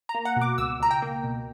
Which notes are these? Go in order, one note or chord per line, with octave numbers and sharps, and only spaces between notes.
A#5
A#3
F#5
B2
D6
C#2 E6
C#2 A#5
G5
A#3
B2